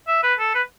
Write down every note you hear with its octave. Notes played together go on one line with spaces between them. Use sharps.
E5
B4
A4
B4